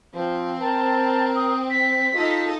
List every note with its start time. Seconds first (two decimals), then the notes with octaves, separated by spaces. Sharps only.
0.14 F3 C4
0.61 A#4 A5
1.36 D#6
1.70 B6
2.14 D#4 F4 A4 D#5